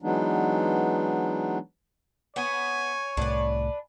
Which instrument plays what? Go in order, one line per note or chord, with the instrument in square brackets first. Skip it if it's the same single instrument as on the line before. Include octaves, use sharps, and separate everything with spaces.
[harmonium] E3 F#3 G#3 B3 D4 D#4
[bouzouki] B3 [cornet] C#5 [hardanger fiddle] G#5
[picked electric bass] C2 A2 [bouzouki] D4 B4